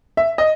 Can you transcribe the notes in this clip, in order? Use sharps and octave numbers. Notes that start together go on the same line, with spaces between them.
E5
D#5